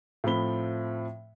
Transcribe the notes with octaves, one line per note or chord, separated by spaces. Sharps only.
A2 F3 C4 B5 G7